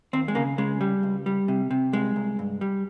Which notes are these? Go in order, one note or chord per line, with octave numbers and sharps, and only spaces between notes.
D#2 C4
G#3
C#3 A#3
C#3 G#3
G3
C#2
G3
C3
C3
C2 G#3
C2
G2
G3